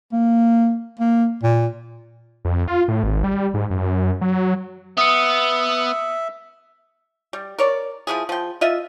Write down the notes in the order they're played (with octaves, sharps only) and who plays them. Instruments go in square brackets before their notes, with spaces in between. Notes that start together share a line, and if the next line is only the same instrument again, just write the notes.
[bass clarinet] A#3
A#3
A#2
[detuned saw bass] F2
F4
A2
G#1
G3
G#2
F#2
F#3
[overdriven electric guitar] B3 [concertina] E5 [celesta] D#6 C#7
[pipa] G3
A#4 C#5 D5
F3 G#3 E4 G#4
F3 G5
F4 D#5 E5